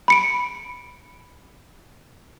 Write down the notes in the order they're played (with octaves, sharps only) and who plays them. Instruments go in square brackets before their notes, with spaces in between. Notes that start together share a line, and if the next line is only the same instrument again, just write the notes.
[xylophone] B5 C#7 D7